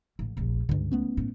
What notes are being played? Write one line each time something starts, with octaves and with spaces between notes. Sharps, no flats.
A1
F1 A#1
C#2 G2 D3
A3 B3 C#4
A2